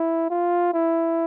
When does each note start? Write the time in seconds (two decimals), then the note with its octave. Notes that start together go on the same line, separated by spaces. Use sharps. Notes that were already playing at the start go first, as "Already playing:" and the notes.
Already playing: E4
0.30 F4
0.74 E4